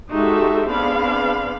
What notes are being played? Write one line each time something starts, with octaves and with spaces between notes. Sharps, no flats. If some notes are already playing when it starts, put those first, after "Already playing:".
G#3 D#4 F#4 G4 A4 E5
B3 C4 D4 G#4 F5 B5